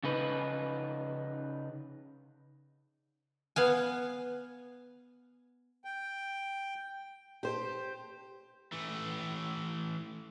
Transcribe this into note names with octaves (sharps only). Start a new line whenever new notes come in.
C#3 D#4 B4
B3 F5 G#5
G5
G4 C5
E3 A3